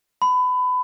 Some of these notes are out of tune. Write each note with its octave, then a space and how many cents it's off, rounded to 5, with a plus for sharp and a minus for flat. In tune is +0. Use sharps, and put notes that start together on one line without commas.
B5 +25